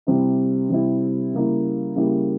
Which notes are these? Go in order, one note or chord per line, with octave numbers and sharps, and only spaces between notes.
C3 G3 C4 E4
C3 G3 C4 E4
C#3 G3 A#3 E4
C#3 G3 A#3 E4